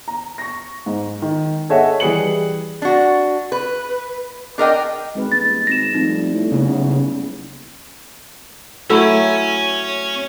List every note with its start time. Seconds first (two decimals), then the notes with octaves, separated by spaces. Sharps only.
0.08 A#5
0.38 C#6 A#6
0.86 G#2
1.22 D#3
1.69 G#4 A4 C#5 D#5 E5 F#5
2.00 E3 G3 G#4 B4 C#7 F#7
2.82 D4 F#4
3.52 B4
4.58 D4 A#4 D#5 G5
5.15 G#1 G#3 G#4 B4
5.32 D#1 A6
5.67 G#1 A#6 E7
5.94 F2 G3 A3 D#4
6.34 A2
6.52 F#1 C#3 B3 C#4 E4
8.90 F#3 A3 C#4 E4